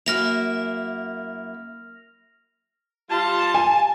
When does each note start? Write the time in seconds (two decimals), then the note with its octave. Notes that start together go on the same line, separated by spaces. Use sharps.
0.06 F#2 A#3 E4 F6 A#6 F7
3.11 G3 F4 A5
3.54 G#5